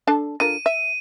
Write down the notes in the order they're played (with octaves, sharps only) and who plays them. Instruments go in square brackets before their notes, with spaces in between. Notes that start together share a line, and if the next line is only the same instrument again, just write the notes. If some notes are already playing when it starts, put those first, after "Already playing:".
[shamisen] D4 A4 A5
[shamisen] D3 F4 A#4 [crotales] D#7
[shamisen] E5